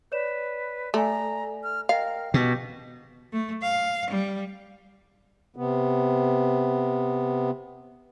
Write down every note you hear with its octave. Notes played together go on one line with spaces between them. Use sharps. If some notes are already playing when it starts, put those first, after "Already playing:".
B4 C#5 D5 E7
A3 A4 D5 G#5 A#5
F6
A#4 D#5 F5 G5
B2 G4
A3
F5
G3
C3 B3